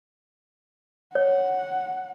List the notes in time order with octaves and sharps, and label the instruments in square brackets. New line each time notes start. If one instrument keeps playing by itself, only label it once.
[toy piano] C#5 [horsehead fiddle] F#5